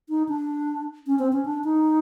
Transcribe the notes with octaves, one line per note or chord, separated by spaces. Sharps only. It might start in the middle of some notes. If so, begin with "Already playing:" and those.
D#4
D4
C#4
C4
C#4
D4
D#4